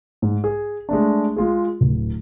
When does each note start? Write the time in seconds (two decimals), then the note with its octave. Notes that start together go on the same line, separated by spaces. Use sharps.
0.22 G#2
0.44 G#4
0.89 G#3 A3 D4
1.36 G#3 F4 G#4
1.81 D1